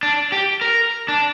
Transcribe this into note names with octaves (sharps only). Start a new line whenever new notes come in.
D4
G4
A#4
D4